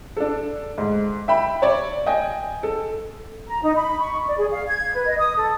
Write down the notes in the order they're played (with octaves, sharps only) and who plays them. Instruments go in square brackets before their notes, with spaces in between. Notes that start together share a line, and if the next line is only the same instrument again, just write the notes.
[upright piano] D4 A4
G#2
E5 G5 B5
C#5 D5
D#5 G5 G#5
A4
[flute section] A#5
D#4
B5
C#6
D5
G#4
F5
G#6
B4
D#5
D#6
A4